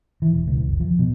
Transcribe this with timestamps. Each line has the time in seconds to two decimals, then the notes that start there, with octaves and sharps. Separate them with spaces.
0.22 E3
0.33 E1
0.48 C#2
0.68 F#1
0.80 F3
0.99 B2